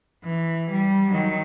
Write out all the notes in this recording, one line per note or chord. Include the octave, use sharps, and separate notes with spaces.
E3
G3
D#3 F#3